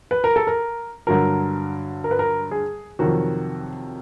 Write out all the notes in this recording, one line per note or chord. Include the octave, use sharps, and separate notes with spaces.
B4
A#4
A4
A#4
G2 D3 F#3 A#4
A#4
B4
A#4
G#4
F2 C3 D#3 F#3 F#4